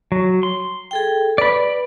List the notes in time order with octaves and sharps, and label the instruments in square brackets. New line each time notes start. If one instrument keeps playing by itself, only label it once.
[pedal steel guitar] F#3
C6
[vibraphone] G#4 A4 G5
[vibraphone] B4 [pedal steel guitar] D5 B5